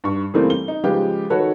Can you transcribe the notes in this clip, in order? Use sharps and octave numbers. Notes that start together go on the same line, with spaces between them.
G2 C#6
C#3 E3 G3 A3 A#3 C4
G7
D#4
C#3 F3 G#3 F4 G4 B4
D#3 F#4 A4 B4 C#5